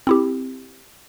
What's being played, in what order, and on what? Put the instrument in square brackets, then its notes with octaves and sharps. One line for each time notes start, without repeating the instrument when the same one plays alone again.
[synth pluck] C4 E4 G4